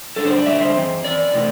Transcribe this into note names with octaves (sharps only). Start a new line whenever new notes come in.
D3 G3 D4 A4
C5
D5
D3 G3 D4 E5
C5
E3 C4
E3 C4 D5
C3 E3 A3 C4